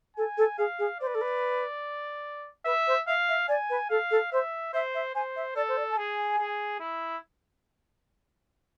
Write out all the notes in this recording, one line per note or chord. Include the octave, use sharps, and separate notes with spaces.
A4 G#5
A4
G#4 F5
G#4
C5 D5
B4
A4
B4
B4 E5
C5
E5 F5
E5
D5 G#5
B4
A4 F5
A4
C5 E5
C5 E5
E5
C5 G#5
E5
A4 D5
C5
D5
A5
G#4 G#5
G#4
E4